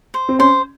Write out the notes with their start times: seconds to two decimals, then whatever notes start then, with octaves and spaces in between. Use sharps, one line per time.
0.14 C5
0.29 C4
0.39 C#4 C5